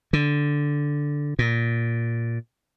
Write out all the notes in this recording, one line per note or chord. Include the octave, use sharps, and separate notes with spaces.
D3
A#2